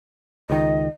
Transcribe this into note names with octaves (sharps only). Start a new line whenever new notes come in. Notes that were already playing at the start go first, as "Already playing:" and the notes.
C#2 D#3 D#5